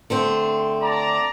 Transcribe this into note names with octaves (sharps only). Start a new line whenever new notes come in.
D3 A3 C4
D5 A5 A#5